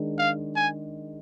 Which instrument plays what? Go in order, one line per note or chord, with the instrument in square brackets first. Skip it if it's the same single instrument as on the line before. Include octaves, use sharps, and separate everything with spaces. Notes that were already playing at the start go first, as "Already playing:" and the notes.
Already playing: [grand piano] D#3 G#3 D4
[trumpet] F5
G#5